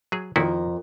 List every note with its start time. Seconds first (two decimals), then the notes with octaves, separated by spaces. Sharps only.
0.12 F#3 G#4
0.36 F2 D#3 E4 F#4 A#4